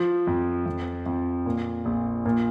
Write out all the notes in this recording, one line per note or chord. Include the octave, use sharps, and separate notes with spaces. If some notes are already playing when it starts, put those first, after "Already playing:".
Already playing: F3
F2
F2
F2
A#2
A#1
A#2